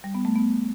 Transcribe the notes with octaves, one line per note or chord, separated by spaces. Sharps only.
G3
B3
A3
B3